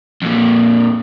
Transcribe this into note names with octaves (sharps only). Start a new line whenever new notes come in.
F2 A#2